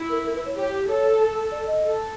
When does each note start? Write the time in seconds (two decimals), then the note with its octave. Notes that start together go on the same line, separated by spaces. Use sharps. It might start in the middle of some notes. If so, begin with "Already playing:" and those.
Already playing: E4
0.09 A#4
0.24 A#4
0.35 B4
0.45 C#5
0.56 G4 C#5
0.88 A4 C#5
1.52 D5
1.67 D#5
1.83 A4